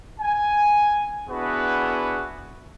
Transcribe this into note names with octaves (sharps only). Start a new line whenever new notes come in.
G#5
B3 D4 E4 F#4 G#4 B4